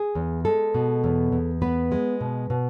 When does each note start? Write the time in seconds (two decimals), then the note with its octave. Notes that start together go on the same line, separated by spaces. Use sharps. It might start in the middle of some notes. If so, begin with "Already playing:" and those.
Already playing: G#4
0.15 E2
0.45 G#3 A4
0.74 B2
1.04 E2
1.32 E2
1.62 B3 B4
1.92 G#3
2.21 B2
2.50 B2